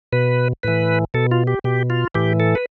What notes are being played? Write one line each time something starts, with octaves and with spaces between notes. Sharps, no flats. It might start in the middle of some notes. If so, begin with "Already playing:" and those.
B2 B4
A2 E3 B4
B2 A4
F4
G4
B2 G4
F4
A2 E3 G4
A4
B4